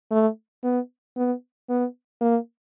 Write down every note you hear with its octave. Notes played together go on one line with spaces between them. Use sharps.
A3
B3
B3
B3
A#3